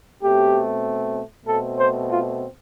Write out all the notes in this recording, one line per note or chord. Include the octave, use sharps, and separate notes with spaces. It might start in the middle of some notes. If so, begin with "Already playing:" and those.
B2 A3 C4 G4
B2 A3 C4 A4
C5
F4